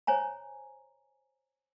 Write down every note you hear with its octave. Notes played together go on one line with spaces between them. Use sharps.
C5 C#5 G#5 A#5